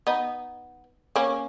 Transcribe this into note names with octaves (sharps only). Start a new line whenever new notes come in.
B3 D#4
A#3 C#4